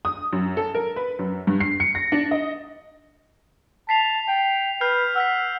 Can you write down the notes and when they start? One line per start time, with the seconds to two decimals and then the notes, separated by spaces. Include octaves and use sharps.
0.05 D#6
0.33 F#2
0.57 A4
0.75 A#4
0.96 B4
1.19 F#2
1.47 G2
1.60 C7
1.80 C#7
1.95 A#6
2.12 D4
2.31 D#5
3.89 A5 B6 C7 F7
4.28 G5
4.81 B4 F6 G6 C7
5.16 F#5 E6 F6 B6